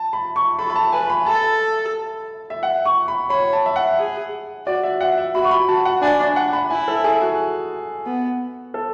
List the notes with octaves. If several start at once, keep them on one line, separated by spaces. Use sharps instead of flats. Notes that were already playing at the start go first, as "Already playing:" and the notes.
Already playing: A5
B5
C#6
A4 B5
B5
A5
B4 G#5
B5
A4 A5
E5
F#5
C#6
B5
C#5 B5
A5
E5
F#5
G#4
F#4 D5
E5
F#5
E5
F#4 B5
C#6
B5
F#4 A5
F#5
D4 G#5
F#5
B5
E4 G#5
A4
G#4
F#4
B3
A4